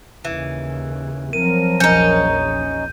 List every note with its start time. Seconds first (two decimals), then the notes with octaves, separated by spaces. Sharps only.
0.24 D#2 C#3 E3
1.33 F3 F#3 C4 A#4 D#7
1.80 A#1 E2 C#4 D#4 G6